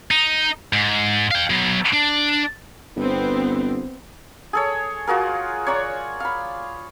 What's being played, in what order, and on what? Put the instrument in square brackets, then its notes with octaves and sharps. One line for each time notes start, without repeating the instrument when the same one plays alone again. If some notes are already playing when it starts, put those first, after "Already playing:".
[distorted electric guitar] D#4
G#2
F5 G5
F#3 B3
D4
[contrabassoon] G1 [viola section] B3 C4
[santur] G#4 A4 C#5
F4 F#4 G#4 A#4
C#5 D5 A#5 C#6
F5 B5